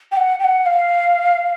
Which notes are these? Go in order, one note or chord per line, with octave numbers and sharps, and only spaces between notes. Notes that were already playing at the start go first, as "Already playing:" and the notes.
G5
F#5
G5
F#5
F5